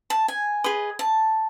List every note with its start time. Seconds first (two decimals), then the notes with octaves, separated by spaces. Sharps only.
0.10 A5
0.28 G#5
0.64 G#4 B4 D#5
0.99 A5